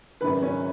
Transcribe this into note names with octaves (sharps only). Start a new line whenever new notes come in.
G#1 F#2 C#3 B4
C#4 C#5